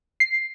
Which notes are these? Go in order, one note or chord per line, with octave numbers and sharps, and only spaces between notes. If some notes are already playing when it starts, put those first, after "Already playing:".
C7